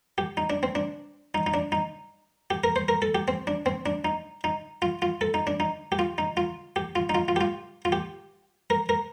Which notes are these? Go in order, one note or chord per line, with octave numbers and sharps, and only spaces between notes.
G4
D#4
D4
C4
D4
D#4
D#4
D4
D#4
G4
A#4
C5
A#4
A4
G4
C4
D4
C4
D4
D#4
D#4
F4
F4
A4
D#4
D4
D#4
G4
F4
D#4
F4
G4
F4
D#4
F4
F4
G4
F4
F4
G4
A#4
A#4